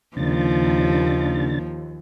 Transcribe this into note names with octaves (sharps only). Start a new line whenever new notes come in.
D#2 C#3 F3 D4 A6